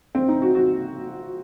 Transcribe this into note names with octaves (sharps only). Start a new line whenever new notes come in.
C4
D#4
F#4
F#4